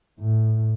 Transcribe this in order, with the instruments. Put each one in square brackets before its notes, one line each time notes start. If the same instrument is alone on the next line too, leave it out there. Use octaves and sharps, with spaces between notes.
[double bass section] A2